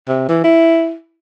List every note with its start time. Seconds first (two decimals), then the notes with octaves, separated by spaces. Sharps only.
0.08 C3
0.29 E3
0.44 E4